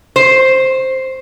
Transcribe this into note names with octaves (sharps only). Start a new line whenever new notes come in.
C5